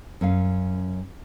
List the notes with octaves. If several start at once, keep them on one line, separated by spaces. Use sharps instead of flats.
F#2 C#4 F5